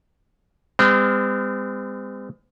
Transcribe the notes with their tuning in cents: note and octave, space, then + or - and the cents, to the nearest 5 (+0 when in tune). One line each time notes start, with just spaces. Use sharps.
G#3 -45 C4 -40